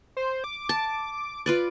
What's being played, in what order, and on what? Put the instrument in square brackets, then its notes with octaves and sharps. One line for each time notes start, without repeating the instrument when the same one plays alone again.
[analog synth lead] C5
D6
[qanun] A5
F4 B4 D5